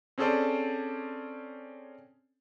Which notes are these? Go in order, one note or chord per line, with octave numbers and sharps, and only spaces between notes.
C4 C#4 G#4 A4 C5 D5